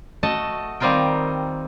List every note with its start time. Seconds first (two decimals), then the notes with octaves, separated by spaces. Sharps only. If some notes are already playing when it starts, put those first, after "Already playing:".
0.23 A3 F#4 D#5 A5
0.80 D#3 G3 C4 F4 A#4 G5